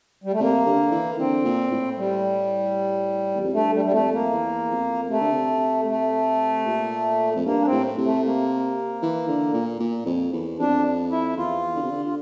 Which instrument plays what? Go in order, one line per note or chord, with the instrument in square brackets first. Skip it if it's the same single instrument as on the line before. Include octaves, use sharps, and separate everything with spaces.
[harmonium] G3
A3
[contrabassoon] C3 [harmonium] A#3
[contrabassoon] D3
E3
[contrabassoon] D3 [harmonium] C4
[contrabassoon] A#2
A2
[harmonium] G3
[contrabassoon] E2
F2
[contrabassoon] G2 [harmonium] A3
[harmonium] G3
G3
[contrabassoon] F2 [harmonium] A3
[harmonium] A#3
[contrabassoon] E2
F2
[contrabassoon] C3 [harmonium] A3
[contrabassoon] D3
C3
[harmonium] A3
[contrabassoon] A#2
F2
[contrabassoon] G2 [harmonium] A#3
[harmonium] D4
C4
[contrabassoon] A2
C3
[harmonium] A3
A#3
[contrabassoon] E3
D3
A#2
A#2
F2
E2
[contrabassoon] F2 [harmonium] D4
[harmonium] E4
[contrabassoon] E2 [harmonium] F4
[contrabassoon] D3
C3
D3
[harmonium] F4